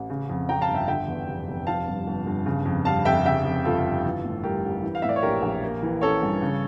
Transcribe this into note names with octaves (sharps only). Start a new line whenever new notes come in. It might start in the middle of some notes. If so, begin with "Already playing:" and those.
Already playing: A1
C#3
F2
F3 G5 A#5
F5 A5
G1
E5 G5
D3 E5 G5
E2
F1
F1
F3 F5 A5
G2
G1
G1
C#3
F2
G3 F5 A5
F1 E5 G5
C#3 E5 G5
F2
G1 F4 A4
G1
E3
A2
G3 G4 A#4
A1
E3
F5
A2 E5
D5
C#5
A#1 G4 A#4
A#1
A#3
E3
C#4 A4 C#5
G2
C#3